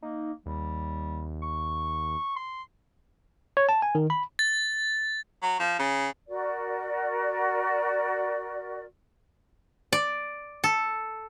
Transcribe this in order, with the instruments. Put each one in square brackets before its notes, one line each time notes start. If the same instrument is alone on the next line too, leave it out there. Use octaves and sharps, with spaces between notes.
[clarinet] A#3 [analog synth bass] D#4
[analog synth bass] D#2 [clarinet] G3
[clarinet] C#6
C6
[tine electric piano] C#5
A5
G#5
D#3
B5
[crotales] A6
[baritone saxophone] F#3
F3
C#3
[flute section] F#4 A#4 D5
[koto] D5
A4